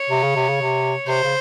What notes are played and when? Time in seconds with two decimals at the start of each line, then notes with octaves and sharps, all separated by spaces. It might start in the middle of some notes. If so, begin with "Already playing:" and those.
Already playing: C#5
0.10 C3
0.23 C#3
0.36 C3
0.49 C#3
0.61 C3
1.07 C3 C5
1.23 C#3